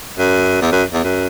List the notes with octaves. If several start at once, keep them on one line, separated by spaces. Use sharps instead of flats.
F#2
E2
F#2
E2
F#2